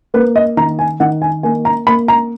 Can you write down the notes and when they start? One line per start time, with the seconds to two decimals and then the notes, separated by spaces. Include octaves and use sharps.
0.14 A#3 B4
0.36 D#5
0.57 D#3 A#5
0.79 G#5
1.00 D#3 F#5
1.22 G#5
1.43 A#3 G#5
1.65 A#5
1.87 A#3 B5
2.08 A#5